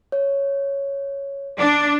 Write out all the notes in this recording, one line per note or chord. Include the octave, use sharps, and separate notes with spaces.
C#5
D4